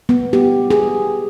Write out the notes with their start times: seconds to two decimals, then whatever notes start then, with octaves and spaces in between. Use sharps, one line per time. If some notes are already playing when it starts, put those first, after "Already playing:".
0.09 B3
0.33 G4
0.70 G#4